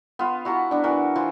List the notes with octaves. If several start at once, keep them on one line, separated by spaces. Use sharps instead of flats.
B3 F4
E4 F#4 A5 A#5
B3 D4
E3 F#4 A#4
E3 F3